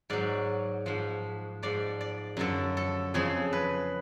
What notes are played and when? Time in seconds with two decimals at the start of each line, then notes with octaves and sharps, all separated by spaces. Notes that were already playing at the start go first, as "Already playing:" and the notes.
0.10 G#2 F#3 D5
0.86 G#2 F3
1.63 G#2 F3 D5
2.01 D5
2.37 F#2 D3 F3 A4
2.77 A4
3.14 F2 C#3 F3 G#4
3.53 B4